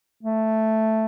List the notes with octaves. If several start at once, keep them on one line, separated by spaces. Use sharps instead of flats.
A3